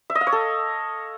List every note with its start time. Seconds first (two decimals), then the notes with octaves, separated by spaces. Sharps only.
0.10 E5
0.15 D#5
0.21 F5
0.27 C#5
0.32 A4